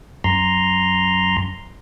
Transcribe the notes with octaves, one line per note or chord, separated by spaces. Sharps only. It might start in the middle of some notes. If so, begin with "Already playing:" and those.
F#2 A#5 C6